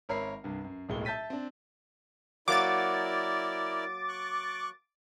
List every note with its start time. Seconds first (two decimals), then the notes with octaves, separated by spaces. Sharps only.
0.09 G#1 A#4 C#5 E5 B5 C7
0.44 C2 G2
0.64 F#2
0.89 D1 B1 A2 G#3 A#3 G7
1.05 E5 A5 G6 A6 B6 D#7
1.30 C4 D4
2.48 F#3 A#3 E4 A#4 D5 D6 A6
4.08 C#6 F#6